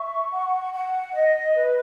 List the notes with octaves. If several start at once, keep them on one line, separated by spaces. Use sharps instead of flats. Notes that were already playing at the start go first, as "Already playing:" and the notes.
Already playing: E5 C#6
F#5
F#5
D#5
B4